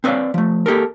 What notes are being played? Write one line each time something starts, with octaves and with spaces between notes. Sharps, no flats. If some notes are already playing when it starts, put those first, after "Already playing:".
C4 B4 C#5 D5 F5
F3 A3
A#3 G4 A4 A#4